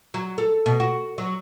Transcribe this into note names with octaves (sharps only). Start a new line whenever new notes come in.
F#3
A4
B2
F#4
F#3